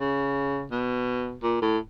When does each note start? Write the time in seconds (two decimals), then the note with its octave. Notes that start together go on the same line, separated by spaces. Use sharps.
0.01 C#3
0.71 B2
1.43 A#2
1.62 A2